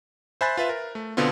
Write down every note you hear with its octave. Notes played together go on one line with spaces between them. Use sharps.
C5 E5 G#5 B5 F#6 A6
F4 B4 E5
A#4
A3
B2 D3 B3 C4 F4